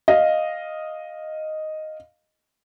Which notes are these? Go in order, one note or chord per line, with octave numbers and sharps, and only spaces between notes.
D#5 F5